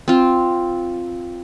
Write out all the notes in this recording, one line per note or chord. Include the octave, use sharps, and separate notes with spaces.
C4 F4